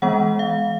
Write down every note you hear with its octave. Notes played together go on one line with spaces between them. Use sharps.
E3 G#3 B3 F#5
F5